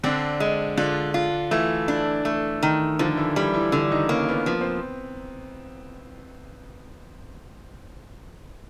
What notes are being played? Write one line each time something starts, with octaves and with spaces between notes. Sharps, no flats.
D3 C4 D4
G#3
D3 D4 F4
F4
E3 A3 E4
D4
A3
D#3
D3 F3 F4
E3 E4
E3 G3 E4
E3 E4
D3
D#3 D#4
C#3 A#3 C#4
B3
F3 B3
C4